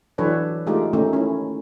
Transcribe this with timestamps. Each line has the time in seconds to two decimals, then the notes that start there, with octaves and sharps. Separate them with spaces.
0.18 E3 F#3 D4 A4 B4 C#5
0.67 G#3 A3 D#4 F4 G4
0.93 D#3 A3 C#4 D#4
1.13 C#4 E4